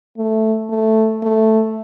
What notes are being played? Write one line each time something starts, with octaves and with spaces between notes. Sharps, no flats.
A3
A3
A3